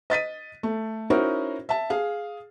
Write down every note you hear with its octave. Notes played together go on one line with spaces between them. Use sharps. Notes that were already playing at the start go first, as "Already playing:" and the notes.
D#5 A6 B6 D#7
A3
C#4 D#4 E4 F#4 A#4 C5
E5 A5
G#4 F5